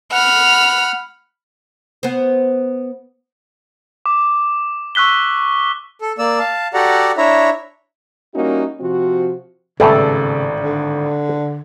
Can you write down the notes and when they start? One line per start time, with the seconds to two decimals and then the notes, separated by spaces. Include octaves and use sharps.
0.12 F#5 B5 F6
2.03 B3 C5
4.06 D6
4.95 C#6 E6 F#6 B6 G7
6.01 A4
6.19 A#3 D5 E6
6.39 F5 A5
6.74 F#4 G4 A4 D5 F#5 A#5
7.17 D4 E4 C#5 E5 A#5
8.34 G3 A#3 C#4 D#4 E4 F#4
8.80 C3 F3 C4 F#4
9.80 G#1 E2 A2 C#3 G3 A3 A4 D5
10.60 D3